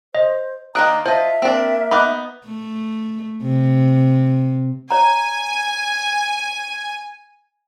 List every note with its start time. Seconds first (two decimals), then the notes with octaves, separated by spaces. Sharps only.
0.15 C5 D#5
0.75 D#3 A#3 D4 A#5 D#6 F#6 D7
1.06 F4 C5 D#5 E5 A5
1.42 A#3 C4 D4
1.91 B3 D#4 B5 D6 F#6
2.46 A3
3.42 C3
4.91 C#5 G#5 A#5